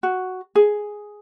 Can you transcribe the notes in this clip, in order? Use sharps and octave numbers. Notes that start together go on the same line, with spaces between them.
F#4
G#4